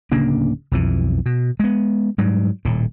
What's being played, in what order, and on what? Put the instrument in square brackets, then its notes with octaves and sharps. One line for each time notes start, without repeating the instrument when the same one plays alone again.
[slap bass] D1 C#3 A#3 D4
B1 F2 E3
B2
G#3 B3
G#2 F#3 G3
D#1 A2